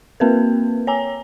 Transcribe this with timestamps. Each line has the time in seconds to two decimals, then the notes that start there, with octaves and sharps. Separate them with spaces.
0.20 A#3 C4 A#4 B4
0.87 C#5 G#5 A#5